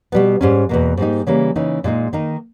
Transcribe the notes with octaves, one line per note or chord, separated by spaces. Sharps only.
B2 G3 B3
G#2 G3 C#4
E2 B2 A#3
G#2 G3 A#3 D#4
C#3 E3 G3 A#3
C#3 E3 A#3 D#4
A#2 G#3 D#4
D#3 A#3 D#4